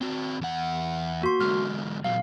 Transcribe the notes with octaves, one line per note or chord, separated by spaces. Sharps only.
C4 F#4
E2 F#5
A#3 F#4 C6
G#2 D3 F6
A#2 F#3 F5